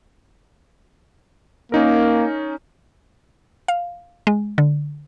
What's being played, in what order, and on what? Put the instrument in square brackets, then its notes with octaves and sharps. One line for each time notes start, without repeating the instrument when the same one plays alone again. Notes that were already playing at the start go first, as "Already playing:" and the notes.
[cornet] A#3 [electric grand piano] C#4 D#4 A#4
[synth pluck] F5
G#3
D3